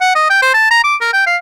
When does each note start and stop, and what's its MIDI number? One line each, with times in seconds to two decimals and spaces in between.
0.01 0.11 78
0.15 0.30 75
0.30 0.41 79
0.42 0.52 72
0.54 0.66 81
0.71 0.81 82
0.84 0.96 86
1.01 1.08 70
1.13 1.23 79
1.27 1.37 77